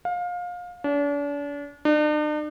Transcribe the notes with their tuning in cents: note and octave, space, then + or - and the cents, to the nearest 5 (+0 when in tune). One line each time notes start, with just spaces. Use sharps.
F5 +25
D4 -40
D4 +45